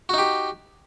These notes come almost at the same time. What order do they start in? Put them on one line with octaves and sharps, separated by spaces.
F#4 D#4 G4